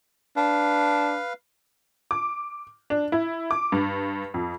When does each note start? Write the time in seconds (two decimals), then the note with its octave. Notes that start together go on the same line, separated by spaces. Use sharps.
0.36 D4 B4 F5
2.11 D6
2.90 D4
3.12 E4
3.51 D6
3.72 G2
4.34 F2